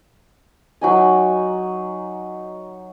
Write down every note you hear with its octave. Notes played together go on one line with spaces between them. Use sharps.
F#3 D#4 G#5